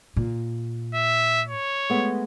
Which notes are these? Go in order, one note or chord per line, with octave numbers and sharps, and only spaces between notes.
A#2
E5
C#5
G#3 A3 B3